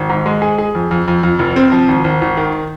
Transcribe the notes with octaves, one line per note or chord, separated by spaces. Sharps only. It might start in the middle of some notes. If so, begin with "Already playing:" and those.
Already playing: G#1
G#2
G#3
G#4
G#4
F2
F2
F2
F2
F1
C4
F3
G#1
G#1
G#1
D#3